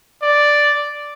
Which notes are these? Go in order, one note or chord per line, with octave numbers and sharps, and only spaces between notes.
D5